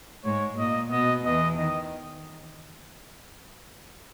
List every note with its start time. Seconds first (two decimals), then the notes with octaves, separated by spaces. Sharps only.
0.25 G#2 G#3 C#5
0.58 A#2 A#3 D#5
0.91 B2 B3 D#5
1.25 E2 E3 D#5
1.58 D#3 D#5